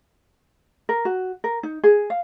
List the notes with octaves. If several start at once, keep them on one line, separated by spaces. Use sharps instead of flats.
A#4
F#4
A#4
D#4
G#4
F5